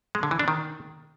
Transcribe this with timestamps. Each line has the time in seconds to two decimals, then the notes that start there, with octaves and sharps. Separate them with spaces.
0.15 G#3
0.23 D3
0.31 E3
0.39 D4
0.48 D#3